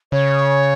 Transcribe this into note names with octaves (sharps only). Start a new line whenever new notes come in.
C#3 C#5